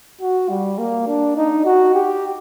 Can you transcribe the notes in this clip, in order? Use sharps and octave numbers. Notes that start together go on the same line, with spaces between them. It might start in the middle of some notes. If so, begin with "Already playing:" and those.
F#4
G3
A#3
D4
D#4
F#4
G4